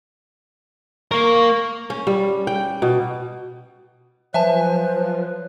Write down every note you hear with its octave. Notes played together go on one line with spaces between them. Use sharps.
A#3 A#4 C#6
C#4
G3
G5
B2
F3 F#3 B4 C5 E5 G#5 A5